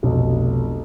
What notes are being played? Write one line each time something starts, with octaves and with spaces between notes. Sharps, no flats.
F1 B1